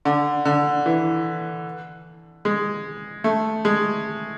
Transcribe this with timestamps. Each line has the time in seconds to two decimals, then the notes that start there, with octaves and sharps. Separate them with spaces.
0.05 D3
0.45 D3
0.86 E3
2.45 G#3
3.24 A3
3.65 G#3